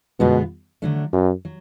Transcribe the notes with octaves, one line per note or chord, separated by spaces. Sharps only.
F#2 B2 D3 G#3 B3 F4
D3 F#3 A3 D4
F#2
F#3